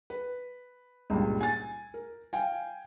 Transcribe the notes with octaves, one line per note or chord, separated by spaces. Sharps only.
B4
C#2 G2 A#2
G#5 A6
A#4
F5 G5 G#5